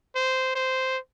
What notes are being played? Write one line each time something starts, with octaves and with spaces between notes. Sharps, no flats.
C5
C5